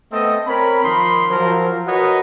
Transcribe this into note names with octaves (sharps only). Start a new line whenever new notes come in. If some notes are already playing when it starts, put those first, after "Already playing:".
A3 B3 C4 A4 D#5
C4 A#4 C#5 B5
D#3 F3 D#4 A#4 B5 C6
F3 F#3 A#4
F#4 A#4 B4 C#5 D#5